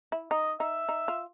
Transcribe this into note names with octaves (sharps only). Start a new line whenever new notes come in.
E4
D#4 D#5
D#4 E5
D#4
F4